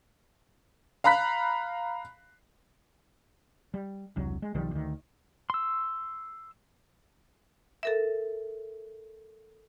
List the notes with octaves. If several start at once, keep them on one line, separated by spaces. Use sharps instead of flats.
F5 A#5 B5 F#6 B6
G3
E1 C2 F#3
G#3
B1 D#3 F3 G3
D2 D#3
C6 E6
A4 A#4 E5